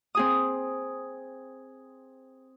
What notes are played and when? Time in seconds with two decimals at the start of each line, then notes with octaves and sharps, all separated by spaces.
0.15 C4 G#4 D#6